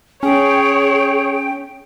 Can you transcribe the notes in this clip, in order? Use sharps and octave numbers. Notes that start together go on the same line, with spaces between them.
C#4 G#4 C#5 G5